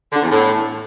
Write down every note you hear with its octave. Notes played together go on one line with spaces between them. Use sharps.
D3
E2
A2